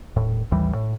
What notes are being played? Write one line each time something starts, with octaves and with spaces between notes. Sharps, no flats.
D#1 A2
A1 D#2 E3 G3
A2